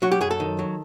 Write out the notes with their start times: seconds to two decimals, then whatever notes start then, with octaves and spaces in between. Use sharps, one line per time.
0.02 F#3 F#4
0.12 G4
0.21 F#2 G#4
0.31 A4
0.40 D#3
0.59 F#3